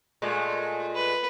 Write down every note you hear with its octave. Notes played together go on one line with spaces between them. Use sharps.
A#2 G#3 A3
B4